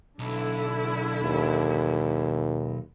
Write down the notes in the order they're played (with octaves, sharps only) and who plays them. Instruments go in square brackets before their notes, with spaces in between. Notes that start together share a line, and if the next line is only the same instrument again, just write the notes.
[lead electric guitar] B1 [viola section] D3 E4
[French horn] D#2